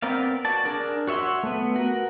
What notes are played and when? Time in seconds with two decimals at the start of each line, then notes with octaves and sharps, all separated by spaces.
0.02 B3 C4 A#4 D5 F5
0.45 F#4 D5 A5
0.65 D4 G#4 A#4 D5
1.07 F#4 C#5 E5 F#5 C6
1.43 A3 B3
1.76 F#4 A#4